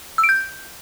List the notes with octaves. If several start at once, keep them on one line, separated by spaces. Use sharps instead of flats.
E6
D7
G6